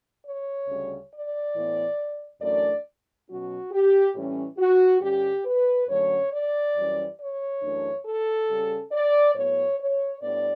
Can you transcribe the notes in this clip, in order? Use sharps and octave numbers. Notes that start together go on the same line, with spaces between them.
C#5
D2 C#3 G3 C#4
D5
A2 E3 B3
F#2 E3 A3 D4 D5
B2 F#3 C#4 F#4
G4
A2 E3 G3 C#4
F#4
G2 D3 G3 C#4 G4
B4
F#2 D3 F#3 A3 C#4 C#5
D5
F#2 E3 G3 C#4
C#5
F#2 E3 A3 D4
A4
C#3 G3 C#4
D5
A2 F#3 B3 C#5
C#5
A2 G3 B3 D4 D5